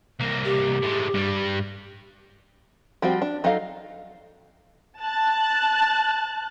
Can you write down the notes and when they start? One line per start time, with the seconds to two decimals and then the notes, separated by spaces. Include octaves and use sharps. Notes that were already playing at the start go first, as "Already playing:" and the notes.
0.20 C2 A#3
0.45 G4
0.82 A2 G#3
1.14 G2 G3
3.02 F3 G3 C4 F#4
3.22 D4
3.44 F#3 D#4 A4 D#5 F5
5.01 A5 F#6